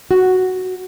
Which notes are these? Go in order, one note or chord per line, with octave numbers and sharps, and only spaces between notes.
F#4